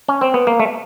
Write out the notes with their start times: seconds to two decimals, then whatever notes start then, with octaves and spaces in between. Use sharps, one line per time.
0.08 C#4
0.21 C4
0.34 B3
0.47 A#3
0.60 A3